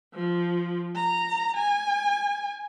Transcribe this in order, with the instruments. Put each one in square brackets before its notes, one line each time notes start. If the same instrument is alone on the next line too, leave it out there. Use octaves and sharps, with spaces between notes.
[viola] F3
A#5
G#5